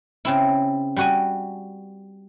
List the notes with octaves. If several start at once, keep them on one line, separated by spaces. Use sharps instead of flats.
C#3 C4 E4
G3 F#4 G#5